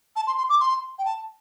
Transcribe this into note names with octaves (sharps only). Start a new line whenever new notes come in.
A5
C6
C6
D6
C6
G5
A5